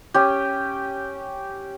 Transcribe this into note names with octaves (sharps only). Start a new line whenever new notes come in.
C#4 G4